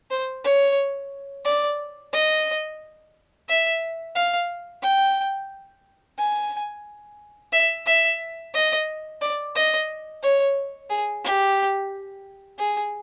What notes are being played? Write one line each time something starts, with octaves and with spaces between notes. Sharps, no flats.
C5
C#5
D5
D#5
E5
F5
G5
G#5
E5
E5
D#5
D5
D#5
C#5
G#4
G4
G#4